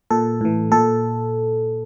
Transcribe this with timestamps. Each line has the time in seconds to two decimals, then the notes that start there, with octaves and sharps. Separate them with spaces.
0.11 A#2 A4
0.41 A2 E3
0.71 A#2 A4